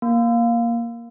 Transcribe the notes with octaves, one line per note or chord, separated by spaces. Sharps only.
A#3